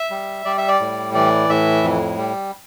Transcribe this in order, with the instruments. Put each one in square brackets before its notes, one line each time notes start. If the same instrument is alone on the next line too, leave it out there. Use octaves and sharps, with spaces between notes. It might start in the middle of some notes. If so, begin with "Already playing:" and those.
Already playing: [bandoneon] E5
G3
G3 D5
E5
D5
A2
E3 D5
A2 E5
F2
G3